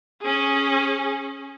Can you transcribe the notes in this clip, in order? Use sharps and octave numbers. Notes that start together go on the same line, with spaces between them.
C#4 G#4